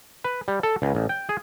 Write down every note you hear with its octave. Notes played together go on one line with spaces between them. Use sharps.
B4
G3
A4
C#2
A1
G5
G#4